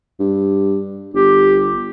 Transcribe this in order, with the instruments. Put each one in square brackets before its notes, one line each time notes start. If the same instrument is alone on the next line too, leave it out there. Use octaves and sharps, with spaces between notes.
[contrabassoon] G2
[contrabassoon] G1 [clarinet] G4